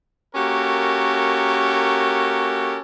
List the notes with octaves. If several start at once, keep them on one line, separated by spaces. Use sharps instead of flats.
A#3 C#4 F#4 G4 A4 A#4